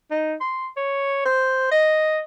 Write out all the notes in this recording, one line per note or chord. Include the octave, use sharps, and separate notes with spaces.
D#4
C6
C#5
C5
D#5